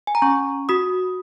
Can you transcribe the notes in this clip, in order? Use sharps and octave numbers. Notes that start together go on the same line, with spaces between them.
G#5
A#5
C#4 C#6
F#4 D#6